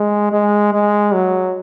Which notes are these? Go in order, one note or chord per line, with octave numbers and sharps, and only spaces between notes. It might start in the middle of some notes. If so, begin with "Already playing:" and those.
Already playing: G#3
G#3
G#3
F#3